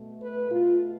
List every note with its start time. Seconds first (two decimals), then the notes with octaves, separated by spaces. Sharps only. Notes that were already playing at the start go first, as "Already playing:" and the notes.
Already playing: B2 A3
0.22 B4
0.50 B2 A3 F4